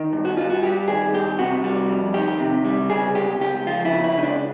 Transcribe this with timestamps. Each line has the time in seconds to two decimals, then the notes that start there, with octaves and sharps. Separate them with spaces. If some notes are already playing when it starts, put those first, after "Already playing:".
Already playing: D#3
0.13 G2
0.25 F#4
0.37 G2 F4
0.50 F#4
0.63 G3 G4
0.88 D#3 G#4
1.13 G2 G4
1.39 C3 F#4
1.64 G3
1.90 F2
2.14 D#3 G4
2.40 C3
2.64 G3
2.90 C#3 G#4
3.15 C#2 G4
3.41 C#2 G4
3.67 F3 F4
3.85 E4
3.91 C#3
4.04 E4
4.17 C#2 D#4
4.23 D4